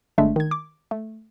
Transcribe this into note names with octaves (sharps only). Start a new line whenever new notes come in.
G1 G#3 A3 D4 E5
D#3 G#6
D6
A3